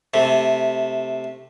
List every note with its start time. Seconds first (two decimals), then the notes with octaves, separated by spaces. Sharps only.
0.14 C3 A3